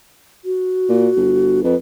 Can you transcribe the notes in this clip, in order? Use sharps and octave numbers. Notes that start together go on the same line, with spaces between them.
F#4
A#2
G1
F2 B4